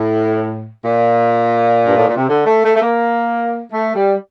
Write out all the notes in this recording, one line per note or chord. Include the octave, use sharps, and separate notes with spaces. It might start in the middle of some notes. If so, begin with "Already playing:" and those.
Already playing: A2
A#2
G2
A2
A#2
C3
D3
A3
A3
A3
A#3
A3
G3